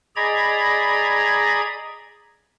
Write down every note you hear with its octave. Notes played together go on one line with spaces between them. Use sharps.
G#4 D5 D#5 A#5 B5 G#6